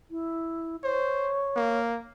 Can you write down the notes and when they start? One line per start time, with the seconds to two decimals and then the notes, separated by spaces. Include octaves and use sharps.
0.11 E4
0.84 C5 C#5
1.56 A#3